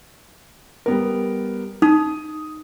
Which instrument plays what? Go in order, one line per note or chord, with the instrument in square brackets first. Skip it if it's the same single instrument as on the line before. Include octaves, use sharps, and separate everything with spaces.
[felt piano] G3 B3 A#4
[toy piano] D#4 [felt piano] D#6